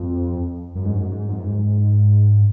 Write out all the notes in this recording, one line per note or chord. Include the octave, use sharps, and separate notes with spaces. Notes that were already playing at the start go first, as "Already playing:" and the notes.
Already playing: F2
F#2
G#2
F#2
G#2
F2
F#2
G#2